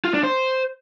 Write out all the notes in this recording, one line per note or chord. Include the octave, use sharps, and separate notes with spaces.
F4
D4
C5